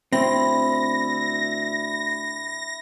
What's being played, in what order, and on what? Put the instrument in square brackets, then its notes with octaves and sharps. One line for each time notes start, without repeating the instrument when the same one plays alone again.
[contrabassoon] D2 [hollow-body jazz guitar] C4 [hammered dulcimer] E4 [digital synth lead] A#6